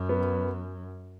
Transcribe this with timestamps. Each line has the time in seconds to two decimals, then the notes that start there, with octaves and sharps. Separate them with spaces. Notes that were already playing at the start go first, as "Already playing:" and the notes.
Already playing: F#2
0.09 B3